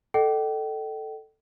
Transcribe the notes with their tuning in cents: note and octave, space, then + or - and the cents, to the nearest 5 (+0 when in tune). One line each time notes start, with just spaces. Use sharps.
A4 +0 D#5 -30 G5 -35